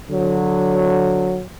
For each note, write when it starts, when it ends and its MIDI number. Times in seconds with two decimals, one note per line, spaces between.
0.11 1.43 50
0.11 1.43 54